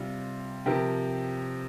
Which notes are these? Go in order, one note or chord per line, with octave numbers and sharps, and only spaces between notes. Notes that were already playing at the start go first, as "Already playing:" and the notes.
Already playing: C3 G3 F4
C3 F3 G4 A#4